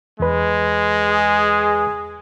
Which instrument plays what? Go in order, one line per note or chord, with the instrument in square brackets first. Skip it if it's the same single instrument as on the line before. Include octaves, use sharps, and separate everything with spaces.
[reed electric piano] E2 B4 [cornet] G#3
[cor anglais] G#4